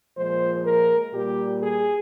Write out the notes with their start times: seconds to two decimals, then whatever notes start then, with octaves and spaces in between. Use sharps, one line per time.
0.17 A#2 F3 G#3 C5
0.65 A#4
1.14 A#2 G3 G4
1.62 G#4